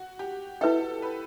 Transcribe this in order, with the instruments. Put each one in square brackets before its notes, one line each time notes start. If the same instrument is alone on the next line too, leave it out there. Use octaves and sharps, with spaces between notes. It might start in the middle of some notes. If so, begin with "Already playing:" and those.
Already playing: [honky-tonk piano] F#4
G4
[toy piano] E4 B4 E5 G5 [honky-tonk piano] A4
[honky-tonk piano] B4